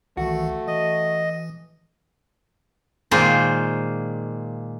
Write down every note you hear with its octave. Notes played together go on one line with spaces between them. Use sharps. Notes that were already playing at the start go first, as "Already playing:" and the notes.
C2 D#3 E3 A3 F#4
E3 D#5
A#2 D#3 G#3 A#3 F4 C5